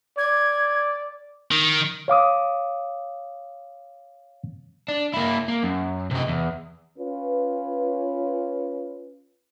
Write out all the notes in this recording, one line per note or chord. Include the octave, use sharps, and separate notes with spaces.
D5 G#6
D#3
C#5 F5 D6 D#6
D4
A#3 E4
A#3
F#2
C3 D#5
E2
C#4 F4 B4